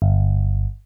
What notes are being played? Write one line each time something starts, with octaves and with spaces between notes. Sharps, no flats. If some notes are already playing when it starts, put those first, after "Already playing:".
G1